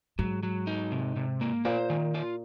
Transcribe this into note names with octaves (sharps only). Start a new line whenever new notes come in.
G#2 F#3
F#3
D#4
C3
C3
A#3
A#2 C5
D#3
F4